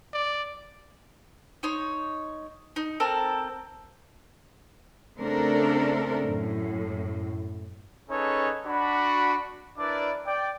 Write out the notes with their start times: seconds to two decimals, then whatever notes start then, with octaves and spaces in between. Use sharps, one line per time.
0.14 D5
1.63 D#4 C#5 C6
2.76 D#4
3.00 C4 A4 A#4
5.18 C#3 A3 C4 D4 A4 A#4
6.25 F#2 A2
8.10 C#4 D#4 G#4 A4 B4 C#5
8.67 D4 F#4 B5
9.78 D4 E4 A#4 B4 D5
10.26 D5 G5 D6